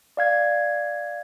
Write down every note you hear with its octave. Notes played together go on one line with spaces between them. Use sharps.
D5 F5 G#6